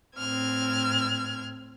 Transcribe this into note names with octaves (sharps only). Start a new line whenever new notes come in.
A2 C4 F6 G#6